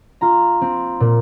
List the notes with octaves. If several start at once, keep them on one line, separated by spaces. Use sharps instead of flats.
F4 A#5
C4
A#2